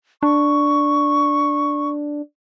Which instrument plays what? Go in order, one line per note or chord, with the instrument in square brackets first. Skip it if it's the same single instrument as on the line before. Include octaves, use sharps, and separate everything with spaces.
[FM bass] D4 [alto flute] C#6